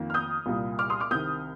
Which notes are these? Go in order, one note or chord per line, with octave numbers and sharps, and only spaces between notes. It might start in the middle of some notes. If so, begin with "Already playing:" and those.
Already playing: F2 D#3 A#3
F6
D#6 G6
C2 A#2 G3 A#3
D6 F6
C6 D#6
D6 F6
C2 C3 D#3 D#6 G6